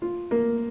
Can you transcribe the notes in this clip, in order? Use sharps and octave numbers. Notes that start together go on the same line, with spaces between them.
F4
A#3